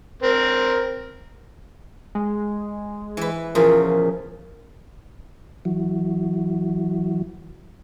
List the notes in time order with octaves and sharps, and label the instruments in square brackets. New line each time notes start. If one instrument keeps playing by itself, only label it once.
[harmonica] C4 A#4
[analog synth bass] G#3
[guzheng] E3 B4
[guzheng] E2 A#2 C#3 [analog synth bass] F3 [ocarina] A#4
[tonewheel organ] E3 F#3